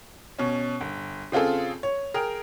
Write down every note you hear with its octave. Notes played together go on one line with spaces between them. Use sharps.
B2 C#4
G1
C#3 C4 F4 G#4 A4
C#5
G#4 A#4 G5 F6